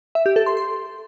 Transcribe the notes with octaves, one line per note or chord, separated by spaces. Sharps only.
E5
G4
A4
C6
C6